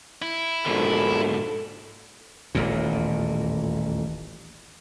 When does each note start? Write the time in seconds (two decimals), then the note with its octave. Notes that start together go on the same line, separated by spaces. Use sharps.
0.22 E4
0.66 A#1 G#2 B2 D3 A4
2.55 D#1 A1 E2 A#2